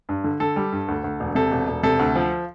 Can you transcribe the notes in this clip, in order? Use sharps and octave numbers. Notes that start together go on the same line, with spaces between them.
G2
D3
D3 A4
G3
G2
D2
D2
E1
C3 A4
E1
E1
C3 A4
D2
F3